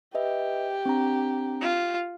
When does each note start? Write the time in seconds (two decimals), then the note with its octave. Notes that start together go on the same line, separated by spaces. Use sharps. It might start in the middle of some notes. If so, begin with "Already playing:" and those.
0.15 G4 B4 D#5 E5
0.86 C4 D4 A#5
1.61 F4